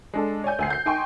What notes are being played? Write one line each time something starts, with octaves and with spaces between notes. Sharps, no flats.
G#3 D4 A4
C#5 D5 G#5 G6
D2 G#5 C7
G6 C7
D#4 G5 G#5 C6 C#6